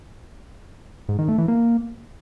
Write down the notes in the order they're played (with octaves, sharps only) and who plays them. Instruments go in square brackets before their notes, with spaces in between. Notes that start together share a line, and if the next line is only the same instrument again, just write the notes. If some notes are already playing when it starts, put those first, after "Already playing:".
[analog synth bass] G#2
D#3
A3
E3
A#3